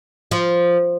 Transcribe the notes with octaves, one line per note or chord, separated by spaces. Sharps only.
F3